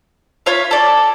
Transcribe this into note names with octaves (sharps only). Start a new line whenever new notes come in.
F4 C#5 E5 F5
A4 D5